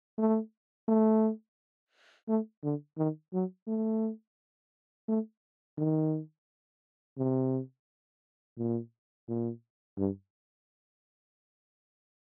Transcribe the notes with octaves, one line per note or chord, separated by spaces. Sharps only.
A3
A3
A3
D3
D#3
F#3
A3
A3
D#3
C3
A#2
A#2
G2